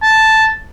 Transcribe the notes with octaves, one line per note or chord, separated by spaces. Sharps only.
A5